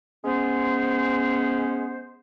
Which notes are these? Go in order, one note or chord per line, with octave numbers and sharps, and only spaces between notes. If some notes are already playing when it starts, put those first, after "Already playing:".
G#3 B3 C#4 C5